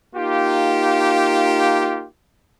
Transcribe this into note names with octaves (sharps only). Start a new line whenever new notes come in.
A#3 D#4 F4 G4